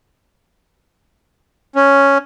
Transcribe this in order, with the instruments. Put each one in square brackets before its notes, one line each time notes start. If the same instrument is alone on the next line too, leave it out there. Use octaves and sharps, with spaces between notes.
[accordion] C#4